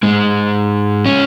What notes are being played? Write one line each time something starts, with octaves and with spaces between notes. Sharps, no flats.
G#2 G#3
C#4